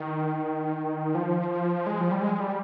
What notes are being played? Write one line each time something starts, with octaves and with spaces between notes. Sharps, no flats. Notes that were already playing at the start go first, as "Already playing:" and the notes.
Already playing: D#3
F3
G#3
F3
G3
G#3
G3